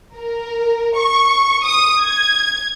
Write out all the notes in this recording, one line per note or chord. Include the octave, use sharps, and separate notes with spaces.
A#4
C#6
D#6
G#6